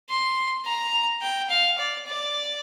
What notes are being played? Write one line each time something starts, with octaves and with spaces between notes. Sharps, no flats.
C6
A#5
G5
F5
D5
D5